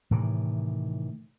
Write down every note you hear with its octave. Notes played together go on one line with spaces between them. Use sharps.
A2 C3 D#3 E3